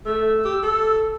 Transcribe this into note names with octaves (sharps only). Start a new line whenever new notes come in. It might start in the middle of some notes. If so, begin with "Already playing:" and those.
A3 E6
G4
A4